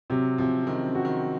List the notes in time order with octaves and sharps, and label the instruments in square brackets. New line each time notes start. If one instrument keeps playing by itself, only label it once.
[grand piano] C3 [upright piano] F#3
[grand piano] C3 [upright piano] F3
[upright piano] C#3
[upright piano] D#3 [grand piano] C4
[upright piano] C#3
[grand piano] F#4
[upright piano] D#3